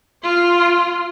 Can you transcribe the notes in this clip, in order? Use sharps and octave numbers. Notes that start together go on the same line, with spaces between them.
F4 C6